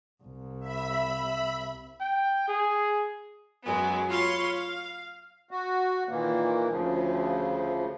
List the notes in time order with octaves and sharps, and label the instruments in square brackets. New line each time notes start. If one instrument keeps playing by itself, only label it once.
[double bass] C2
[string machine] E5 B5
[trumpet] G5
G#4
[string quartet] F#2 F#3 G#3 B3
F4 C#5 F5 B5 C6
F5
[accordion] F#4
A#2 D#3 E3 A#3
D2 C#3 F3